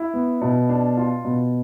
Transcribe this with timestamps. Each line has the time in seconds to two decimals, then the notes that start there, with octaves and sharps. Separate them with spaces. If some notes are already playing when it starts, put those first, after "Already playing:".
Already playing: E4
0.14 B3
0.42 B2
0.69 D4
0.97 F4
1.25 B2